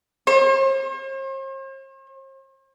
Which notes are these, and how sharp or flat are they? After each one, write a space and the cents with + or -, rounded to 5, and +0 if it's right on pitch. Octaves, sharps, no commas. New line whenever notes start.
C5 +45 C6 +40